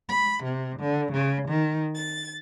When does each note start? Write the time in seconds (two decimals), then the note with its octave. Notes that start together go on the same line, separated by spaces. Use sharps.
0.10 B5
0.44 C3
0.79 D3
1.13 C#3
1.49 D#3
1.95 A6